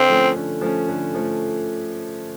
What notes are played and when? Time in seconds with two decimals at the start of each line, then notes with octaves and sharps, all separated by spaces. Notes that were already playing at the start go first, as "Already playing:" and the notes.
Already playing: D3 C4
0.09 F3 A3 C#4
0.36 D3
0.61 F3 A3 C#4
0.88 D3
1.14 F3 A3